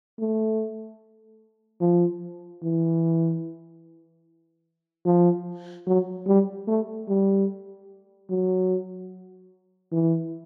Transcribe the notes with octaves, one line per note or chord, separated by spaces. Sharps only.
A3
F3
E3
F3
F#3
G3
A3
G3
F#3
E3